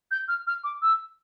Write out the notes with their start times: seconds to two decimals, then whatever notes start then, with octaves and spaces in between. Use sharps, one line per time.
0.11 G6
0.28 F6
0.47 F6
0.64 D6
0.82 E6